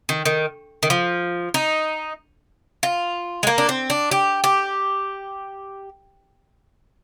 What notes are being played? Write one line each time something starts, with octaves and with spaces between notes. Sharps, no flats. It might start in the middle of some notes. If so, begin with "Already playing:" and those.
D#3
D#3
D#3
F3
D#4
F4
G#3
A#3
D4
C4
D4
G4
G4